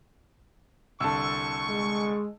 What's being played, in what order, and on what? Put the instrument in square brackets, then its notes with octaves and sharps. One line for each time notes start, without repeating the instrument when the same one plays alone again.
[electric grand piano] C2 D3 [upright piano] A5 E6 [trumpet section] C#6
[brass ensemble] G#3